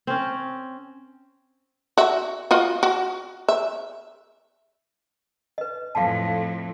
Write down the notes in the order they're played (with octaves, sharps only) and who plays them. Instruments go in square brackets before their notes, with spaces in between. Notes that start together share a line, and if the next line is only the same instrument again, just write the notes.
[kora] C4 C#4
[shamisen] F#4 E5
F4 F#4 D#5
F#4
E5
[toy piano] B4 D#5
[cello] F2 A2 [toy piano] F5 A5